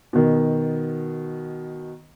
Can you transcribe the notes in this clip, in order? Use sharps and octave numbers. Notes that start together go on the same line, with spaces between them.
B2 D#3